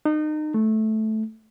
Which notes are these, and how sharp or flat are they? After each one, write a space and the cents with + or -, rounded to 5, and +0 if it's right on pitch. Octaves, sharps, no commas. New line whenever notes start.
D#4 -30
A3 -10